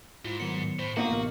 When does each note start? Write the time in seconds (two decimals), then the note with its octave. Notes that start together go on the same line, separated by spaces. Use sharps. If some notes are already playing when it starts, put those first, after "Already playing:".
0.25 G#2 E4 F4
0.40 D#3 F#3 B3 C#7
0.79 A2 C5
0.97 A#3 B3 D#4 F4 F#4 F#5
1.10 A1 C3 A#4